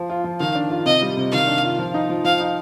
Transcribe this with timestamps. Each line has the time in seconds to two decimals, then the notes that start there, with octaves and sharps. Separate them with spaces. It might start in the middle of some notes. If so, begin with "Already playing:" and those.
Already playing: F3
0.10 F4
0.24 F3
0.40 D#3 F5
0.55 D4
0.70 F4
0.85 C3 D#5
1.02 G3
1.17 C3
1.32 D#3 F5
1.47 D4
1.64 F4
1.78 F3
1.94 D#4
2.10 F3
2.24 F3 F5
2.40 D#4